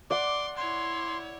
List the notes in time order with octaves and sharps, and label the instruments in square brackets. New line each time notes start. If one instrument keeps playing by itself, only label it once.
[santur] D5 F#5 [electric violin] C6 [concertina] D6
[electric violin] E4 C#5 [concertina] C6